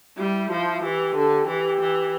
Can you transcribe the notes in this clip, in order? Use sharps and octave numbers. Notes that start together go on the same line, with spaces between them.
G3 E4
F3
E3 G4
D3
E3 G4
E3